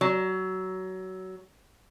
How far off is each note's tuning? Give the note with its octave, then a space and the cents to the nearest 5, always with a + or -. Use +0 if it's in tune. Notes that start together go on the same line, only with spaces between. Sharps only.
F#3 +20